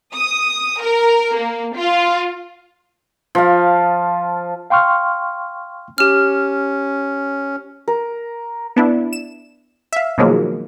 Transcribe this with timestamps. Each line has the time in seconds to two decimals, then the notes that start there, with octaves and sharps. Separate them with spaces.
0.15 D#6
0.82 A#4
1.37 A#3
1.77 F4
3.35 F3 F5
4.70 F5 G5 C6 C#6 F6
5.98 C#4 G4 F6
7.88 A#4
8.76 B3 D4 E4
9.13 E7
9.93 E5 F5
10.18 B2 D#3 F3 F#3 G#3 A#3